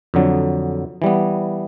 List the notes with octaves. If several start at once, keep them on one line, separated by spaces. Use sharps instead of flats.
F2 D3 F#3
E3 G3 B3